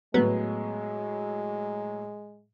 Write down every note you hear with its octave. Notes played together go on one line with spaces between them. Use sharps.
A2 F#3 G#3 B3